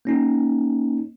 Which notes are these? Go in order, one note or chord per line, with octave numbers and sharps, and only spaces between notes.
A#3 C#4 D#4